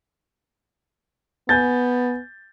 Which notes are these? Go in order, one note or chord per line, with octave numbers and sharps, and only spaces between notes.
B3 G#5 G6 A6